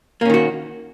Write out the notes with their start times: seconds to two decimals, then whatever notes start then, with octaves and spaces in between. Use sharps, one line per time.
0.21 A#3
0.25 C#4
0.30 D#3
0.34 F#4